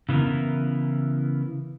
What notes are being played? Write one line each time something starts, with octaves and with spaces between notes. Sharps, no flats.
C#3 E3 B3 E4 A#4